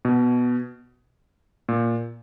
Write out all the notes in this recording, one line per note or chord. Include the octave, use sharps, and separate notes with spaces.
B2
A#2